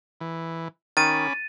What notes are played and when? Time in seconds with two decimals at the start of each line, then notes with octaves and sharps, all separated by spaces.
0.21 E3
0.97 D#3 C#4 B5 D6 A6 D#7